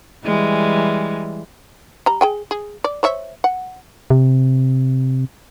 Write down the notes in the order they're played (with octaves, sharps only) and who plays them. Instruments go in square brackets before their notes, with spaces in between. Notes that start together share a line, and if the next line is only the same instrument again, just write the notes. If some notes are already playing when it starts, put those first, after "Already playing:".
[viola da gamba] E3 G3 G#3
[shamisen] G3 A#5
G#4 G5 G#5
G#4
D5
C5 C#5 E5
F#5
[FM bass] C3